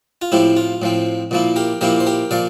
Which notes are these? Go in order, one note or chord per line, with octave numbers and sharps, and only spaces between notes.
F4
A2 F3 C4 E4 G4
F4
A2 F3 C4
A#2 F3 A#3 E4
G4 A#4
A#2 F3 A#3 E4 G4 A#4
C5
G4 A#4
A#2 F3 D5 F5